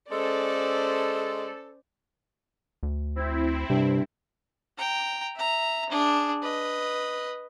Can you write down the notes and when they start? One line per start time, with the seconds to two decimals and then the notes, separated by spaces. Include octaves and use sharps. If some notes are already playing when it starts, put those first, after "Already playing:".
0.11 G#3 C#4 A4 C5 D5
2.83 D2
3.16 C4 E4
3.70 G2 C3
4.78 G5 A#5
5.36 E5 A#5
5.90 D4 G#4
6.42 B4 D#5